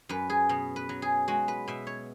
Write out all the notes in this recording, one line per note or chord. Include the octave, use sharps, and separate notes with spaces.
F#2 B4
G#4
B2
B4
F#3
G#4
G#3 F#4
B4
B2 E5
C#5